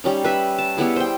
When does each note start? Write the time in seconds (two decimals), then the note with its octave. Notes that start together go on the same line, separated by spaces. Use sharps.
0.04 G3 C#4 D#4
0.24 B4 E5
0.58 A5
0.77 G3 B3 E4 G#4
0.96 C5 G5